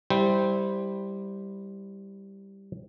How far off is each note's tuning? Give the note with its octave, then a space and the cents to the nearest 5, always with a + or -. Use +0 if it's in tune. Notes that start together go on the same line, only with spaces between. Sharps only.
G3 +0 E4 -20 C5 -5